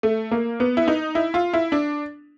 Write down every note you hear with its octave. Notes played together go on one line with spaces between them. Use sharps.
A3
A#3
B3
E4
D#4
E4
F4
E4
D4